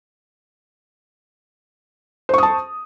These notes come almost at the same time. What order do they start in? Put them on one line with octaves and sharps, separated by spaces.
C5 C#6 D#6 A5